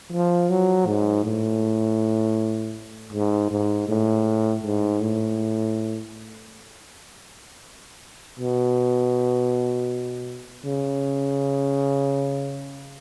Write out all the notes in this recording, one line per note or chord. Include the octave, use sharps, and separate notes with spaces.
F3
F#3
G#2
A2
G#2
G#2
A2
G#2
A2
B2
C#3